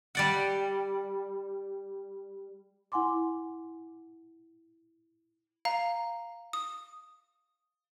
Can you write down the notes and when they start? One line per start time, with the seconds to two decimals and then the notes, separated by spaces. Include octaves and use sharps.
0.15 G3 D5 F#5
2.92 E4 F#5 G#5 C6 D6
5.65 F5 A#5
6.53 D#6